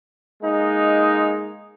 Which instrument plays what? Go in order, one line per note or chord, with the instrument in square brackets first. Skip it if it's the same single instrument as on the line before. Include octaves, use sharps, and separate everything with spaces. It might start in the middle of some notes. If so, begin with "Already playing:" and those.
[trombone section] G#3 A#3 D#4